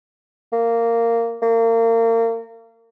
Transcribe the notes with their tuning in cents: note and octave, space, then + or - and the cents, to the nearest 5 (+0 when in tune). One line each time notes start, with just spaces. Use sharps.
A#3 -15
A#3 -30